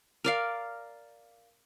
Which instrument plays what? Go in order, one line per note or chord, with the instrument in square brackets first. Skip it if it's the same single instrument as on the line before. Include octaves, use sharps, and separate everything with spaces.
[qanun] A#4 D5 F5